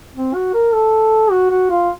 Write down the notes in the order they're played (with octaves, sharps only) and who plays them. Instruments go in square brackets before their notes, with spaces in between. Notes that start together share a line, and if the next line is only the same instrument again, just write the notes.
[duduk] C4
F#4
A#4
A4
F#4
F#4
F4